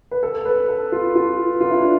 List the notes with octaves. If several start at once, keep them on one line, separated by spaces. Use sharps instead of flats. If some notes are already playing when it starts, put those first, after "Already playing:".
B4
A4
B4
A4
F4
F4
F4
E4
D4